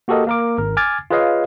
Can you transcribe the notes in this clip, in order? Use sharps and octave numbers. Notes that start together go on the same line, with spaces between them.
A#3 F#4 G4 A4 A#4 D#5
A#3 A#4 D6
G#1 A#4
G#5 D6 F6 G#6 A6
F4 G#4 B4 C#5 D#5 F5